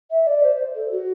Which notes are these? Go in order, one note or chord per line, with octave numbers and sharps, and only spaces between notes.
E5
D5
C5
A4
F#4